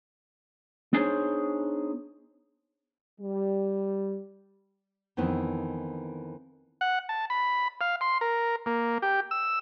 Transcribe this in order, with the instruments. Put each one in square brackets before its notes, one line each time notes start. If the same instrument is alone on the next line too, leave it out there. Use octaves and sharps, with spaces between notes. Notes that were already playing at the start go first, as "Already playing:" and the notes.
[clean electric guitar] B3 D4 D#4 G#4 C5 C#5
[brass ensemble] G3
[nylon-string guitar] F2 D#3 E3 B3 C4
[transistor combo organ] F#5
A5
B5
F5
C6
A#4
A#3
G4
E6